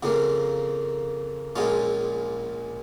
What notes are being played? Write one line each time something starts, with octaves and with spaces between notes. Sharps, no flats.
F2 C#3 F3 A#3
A#1 A#2 G#3 C#4 F4